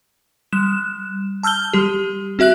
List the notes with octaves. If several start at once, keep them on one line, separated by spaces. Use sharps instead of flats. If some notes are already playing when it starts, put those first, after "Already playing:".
G3 F#6 E7
A5 E6 F6 G6 G7
G3 G4
C4 F#4 E5 F#6 F#7